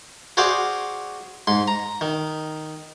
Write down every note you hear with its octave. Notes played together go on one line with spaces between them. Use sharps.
F#4 G#4 C5 D5 F5 F#5
G#2 C6
A#5
D#3